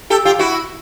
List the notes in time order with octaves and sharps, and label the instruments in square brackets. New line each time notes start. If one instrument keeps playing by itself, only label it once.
[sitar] G4 A4
F4 G4
E4 F#4